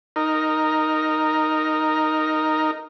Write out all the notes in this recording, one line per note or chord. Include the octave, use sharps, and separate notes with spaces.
D#4 A#4